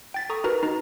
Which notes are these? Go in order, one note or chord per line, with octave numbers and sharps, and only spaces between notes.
G5 A6 B6
A4 A#5 C#6 D#6
D#4 F#4 A#4 B4 A#5
D#4 A#5